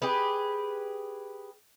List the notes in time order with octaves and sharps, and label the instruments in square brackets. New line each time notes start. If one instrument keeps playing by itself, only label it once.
[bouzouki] G4 G#4 B4